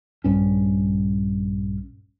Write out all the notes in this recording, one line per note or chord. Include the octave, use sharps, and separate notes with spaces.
A#1 G2 C#4